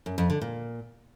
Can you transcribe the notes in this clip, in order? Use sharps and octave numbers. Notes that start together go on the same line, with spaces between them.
F#2
F2
D3
A#2